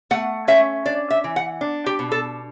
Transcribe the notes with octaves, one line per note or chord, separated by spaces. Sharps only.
A3 F#5
C#4 E5
D4 D5
E5
E3
F#5
D4
G4
B2
A4